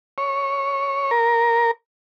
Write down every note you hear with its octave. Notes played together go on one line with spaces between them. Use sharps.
C#5
A#4